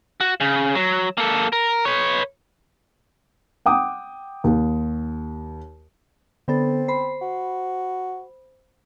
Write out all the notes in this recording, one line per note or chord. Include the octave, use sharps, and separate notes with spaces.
F#4
C#3
F#3
A#3 A4
A#4
B4 C#5
F#5 G5 D6 D#6
D#2
D3 B3 C4 A4
C5 B5
F#4